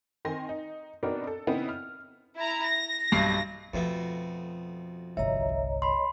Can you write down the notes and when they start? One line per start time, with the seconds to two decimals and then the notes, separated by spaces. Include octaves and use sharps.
0.25 D#3 C4 G#5 C6 A#6
0.49 D#4
1.03 B2 B3 C4 D4 D#4 A#4
1.27 A4
1.47 C#3 B3 C4 D#4 E4
1.69 F6
2.37 E4 A#5
2.67 A#6
3.12 B1 G2 C7
3.74 F2 B2 A3 F4
5.17 G1 C2 C#5 D#5 E5 A#5
5.82 B5 C6